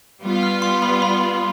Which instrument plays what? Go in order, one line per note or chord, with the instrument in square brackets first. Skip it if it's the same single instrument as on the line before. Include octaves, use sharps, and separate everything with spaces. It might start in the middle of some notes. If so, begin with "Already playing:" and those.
[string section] G3 B3 F4
[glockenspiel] F6
C6
B5
B5